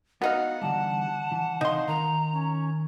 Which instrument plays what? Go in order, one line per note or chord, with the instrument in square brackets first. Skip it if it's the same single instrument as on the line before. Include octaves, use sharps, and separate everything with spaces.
[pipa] B3 D#4 F5 [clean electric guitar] F#4 [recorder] F#5
[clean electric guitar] D3 E3 G3 [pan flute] A5
[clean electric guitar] E3
[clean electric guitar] C3 E3 F5 [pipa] D#4 C6
[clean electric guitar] D#3 A#4 [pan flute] A#5
[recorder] C#4